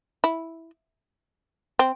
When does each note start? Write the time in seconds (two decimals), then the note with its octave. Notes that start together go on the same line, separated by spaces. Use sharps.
0.24 E4
1.79 C4